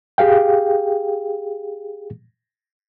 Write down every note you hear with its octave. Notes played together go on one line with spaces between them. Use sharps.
G4 G#4 F5 G5